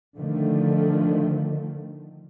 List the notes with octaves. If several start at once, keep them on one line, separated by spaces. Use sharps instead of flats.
D3 D#3 F3 A3